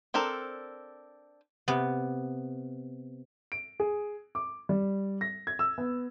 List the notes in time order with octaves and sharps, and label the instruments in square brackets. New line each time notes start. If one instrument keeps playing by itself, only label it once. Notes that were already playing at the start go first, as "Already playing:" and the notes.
[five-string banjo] C4 D4 A4 A#4
[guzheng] C3 B3
[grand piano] D7
G#4
D6
G3
A#6
G#6
E6
B3